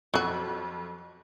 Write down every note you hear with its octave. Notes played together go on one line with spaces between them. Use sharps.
F2 F#3 F#4